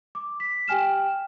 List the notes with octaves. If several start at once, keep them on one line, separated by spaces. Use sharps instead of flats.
D6
B6
G4 G5 G#5 F6 E7